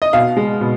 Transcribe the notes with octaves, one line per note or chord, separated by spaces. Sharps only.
D#5
B2 F5
G#3
B2